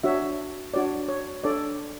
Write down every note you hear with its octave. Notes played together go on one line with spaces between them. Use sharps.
D4 F#4 C#5 E5
D4 F#4 C#5 D5
C#5
D4 A4 C#5 D5